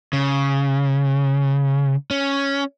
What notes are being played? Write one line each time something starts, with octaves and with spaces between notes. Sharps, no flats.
C#3
C#4